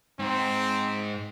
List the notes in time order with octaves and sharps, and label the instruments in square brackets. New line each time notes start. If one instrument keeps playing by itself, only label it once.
[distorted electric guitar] G#2 [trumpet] C4